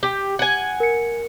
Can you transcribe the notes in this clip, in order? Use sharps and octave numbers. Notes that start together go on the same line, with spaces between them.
G4
F#5 G#5
A#4 C#7